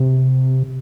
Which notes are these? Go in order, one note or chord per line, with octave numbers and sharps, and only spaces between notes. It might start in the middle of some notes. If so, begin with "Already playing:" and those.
Already playing: C3